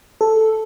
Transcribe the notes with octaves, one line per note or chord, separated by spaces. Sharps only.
A4